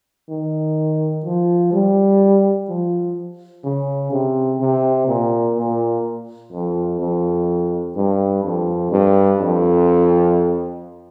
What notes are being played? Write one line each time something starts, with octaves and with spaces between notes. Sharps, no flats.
D#3
F3
G3
F3
C#3
C3
C3
A#2
A#2
F2
F2
G2
F2
G2
F2